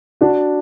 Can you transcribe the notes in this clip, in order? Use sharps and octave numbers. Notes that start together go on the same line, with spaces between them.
D4 F#4